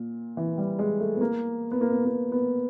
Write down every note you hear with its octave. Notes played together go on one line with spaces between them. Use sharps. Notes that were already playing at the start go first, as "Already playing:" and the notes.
Already playing: A#2
E3
G3
G#3
A3
B3
A#3
B3
A#3
B3
A#3
B3